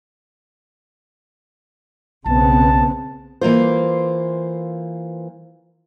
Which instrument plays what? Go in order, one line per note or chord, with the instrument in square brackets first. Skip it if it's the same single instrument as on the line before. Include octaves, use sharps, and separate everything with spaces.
[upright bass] B1 [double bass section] C#3 B3 C4 [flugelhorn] A5
[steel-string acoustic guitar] E3 A#3 F4 C5